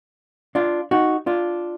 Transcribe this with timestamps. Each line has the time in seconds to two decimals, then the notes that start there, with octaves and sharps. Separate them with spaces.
0.55 D4 F4
0.91 D#4 F#4
1.26 D4 F4